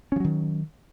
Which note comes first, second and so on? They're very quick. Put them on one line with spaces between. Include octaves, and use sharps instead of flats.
C#4 F3 F#3 D#3